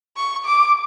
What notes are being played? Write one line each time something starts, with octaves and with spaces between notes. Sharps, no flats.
C#6
D6